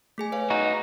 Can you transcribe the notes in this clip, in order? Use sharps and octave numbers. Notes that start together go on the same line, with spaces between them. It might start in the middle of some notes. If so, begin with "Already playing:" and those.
A3 G#4 G#5
B4 C#5 F5
D#4 F#4